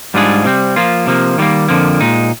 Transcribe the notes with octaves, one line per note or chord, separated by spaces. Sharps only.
G#2 G3 D4 F4 G#4
C3 G3 C4
F3 A#3 F4
C3 F3 A#3
D#3 G3 A#3
F2 D3 F3 A#3
A#2 G#3 D#4